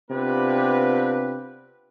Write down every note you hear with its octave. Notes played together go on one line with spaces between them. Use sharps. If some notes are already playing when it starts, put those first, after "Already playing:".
C3 B3 D4 F4 G4 B4